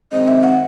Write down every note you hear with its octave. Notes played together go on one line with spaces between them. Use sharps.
F#2 D#3 G#3 C4 D#5
E5
F#5